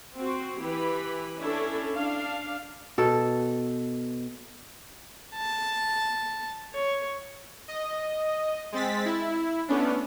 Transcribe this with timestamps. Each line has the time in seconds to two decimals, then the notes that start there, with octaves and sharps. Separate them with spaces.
0.18 C4 F#4
0.61 E3 G4 B4 B5
1.40 C#4 D4 E4 A4 C#5
1.96 D4 F5
2.98 B2 A4
5.35 A5
6.74 C#5
7.68 D#5
8.72 G#3 C4 A6 B6
9.05 E4
9.68 A3 B3 C#4 D4